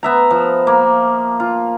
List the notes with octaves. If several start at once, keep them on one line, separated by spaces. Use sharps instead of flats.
B3 E5 A#5
F3
A#3
F4